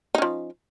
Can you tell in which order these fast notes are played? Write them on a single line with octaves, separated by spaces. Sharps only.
D#4 C#4 F3